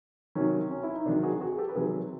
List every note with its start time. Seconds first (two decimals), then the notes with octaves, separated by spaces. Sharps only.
0.35 C3 D#3 F#3 C#4
0.70 C#4
0.83 E4
0.94 D#4
1.05 C3 D#3 F#3 D4
1.22 F#4 G#4
1.41 F#4 G#4
1.52 G#4
1.58 G4 A4
1.69 B4
1.75 C3 D#3 F#3 G#4 A#4